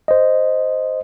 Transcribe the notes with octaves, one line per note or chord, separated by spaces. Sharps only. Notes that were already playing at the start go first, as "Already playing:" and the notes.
C5 D#5